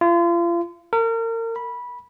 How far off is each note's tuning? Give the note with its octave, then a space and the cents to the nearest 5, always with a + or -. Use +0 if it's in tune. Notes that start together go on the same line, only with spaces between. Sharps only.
F4 -35
A#4 -35
B5 -15